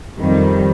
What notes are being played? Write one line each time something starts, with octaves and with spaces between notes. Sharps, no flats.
F2 D#3 G3